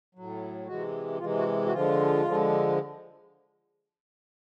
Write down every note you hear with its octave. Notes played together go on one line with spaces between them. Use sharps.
A2 F#3
C3 E3 G#3 F#4
C3 E3 G#3 F4
F#4
F#4
D3 F3 G#3 F4
D3 F3 G#3